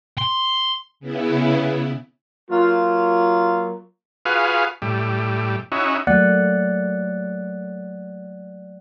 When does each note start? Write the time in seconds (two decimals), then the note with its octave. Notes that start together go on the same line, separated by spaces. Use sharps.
0.18 C6
1.00 C#3 B3 E4
2.51 F#3 A#3 F4
4.26 F4 F#4 G#4 B4 F5
4.82 A2 G3
5.72 C#4 D#4 E4 F#4
6.07 F#3 A3 A#3 D5 F#5 F#6